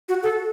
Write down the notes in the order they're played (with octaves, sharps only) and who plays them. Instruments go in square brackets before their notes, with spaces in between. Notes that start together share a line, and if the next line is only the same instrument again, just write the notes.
[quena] F#4
A4